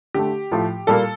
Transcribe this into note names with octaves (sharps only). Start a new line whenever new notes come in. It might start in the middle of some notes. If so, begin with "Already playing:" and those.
D3 A3 G4
A2 F3 A3
A#2 G3 A#3 A4